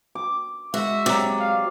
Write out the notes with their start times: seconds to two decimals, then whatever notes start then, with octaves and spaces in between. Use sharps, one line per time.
0.15 D6
0.74 G#3 F#4 E5
1.06 C3 F#3 D5 A#5
1.39 F5